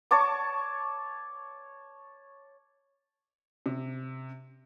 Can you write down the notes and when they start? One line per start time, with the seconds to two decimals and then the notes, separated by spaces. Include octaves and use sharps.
0.11 C#5 A5 C#6 D6
3.66 C3